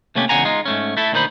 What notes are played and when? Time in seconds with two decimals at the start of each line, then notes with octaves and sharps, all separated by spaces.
0.15 C3 A3 A#3 C#4 G4
0.29 E2 C#3 F#5 G#5 A#5
0.45 G#3 D#4 F4
0.65 G#2 A3 C#4
0.97 A3 E4 A4
1.12 D2 A#2 D#3 D#4 C5 B5